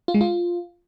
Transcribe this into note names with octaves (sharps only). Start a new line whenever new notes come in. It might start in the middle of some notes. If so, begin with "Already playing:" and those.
F4
G#3
F4